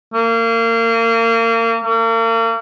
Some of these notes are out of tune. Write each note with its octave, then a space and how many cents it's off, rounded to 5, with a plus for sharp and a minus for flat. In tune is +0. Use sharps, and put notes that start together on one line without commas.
A#3 -30
A#3 -40